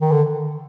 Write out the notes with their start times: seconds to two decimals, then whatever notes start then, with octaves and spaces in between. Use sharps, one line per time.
0.01 D#3
0.12 D3